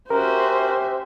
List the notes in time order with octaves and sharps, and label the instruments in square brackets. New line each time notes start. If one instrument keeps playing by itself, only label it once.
[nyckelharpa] C#4 F#4 [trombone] G4 [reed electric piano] A#4 [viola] C5 E5